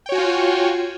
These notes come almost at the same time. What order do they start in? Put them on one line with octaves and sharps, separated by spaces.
G5 C#5 F#4 G#5 F4